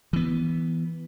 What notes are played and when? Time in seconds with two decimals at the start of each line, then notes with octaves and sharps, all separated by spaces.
0.13 E3 B3